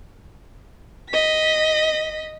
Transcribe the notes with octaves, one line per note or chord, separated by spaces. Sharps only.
D#5 B6